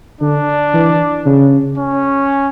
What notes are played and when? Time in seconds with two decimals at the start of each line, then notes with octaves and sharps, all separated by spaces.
0.21 D3 D4
0.74 E3
1.26 C#3
1.78 C#4